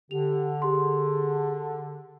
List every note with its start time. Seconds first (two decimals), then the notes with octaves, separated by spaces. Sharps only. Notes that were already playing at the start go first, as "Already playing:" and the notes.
0.11 D3 G4 F7
0.62 G4 G#4 C6